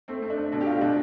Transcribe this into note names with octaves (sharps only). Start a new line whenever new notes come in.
A3 C4
A3
D4
A3
B2 D4
G4
A3 F4
B2 D4